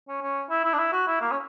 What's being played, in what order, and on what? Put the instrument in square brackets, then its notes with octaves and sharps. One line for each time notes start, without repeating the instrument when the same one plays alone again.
[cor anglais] C#4
C#4
E4
E4
D4
E4
F#4
E4
A#3
C#4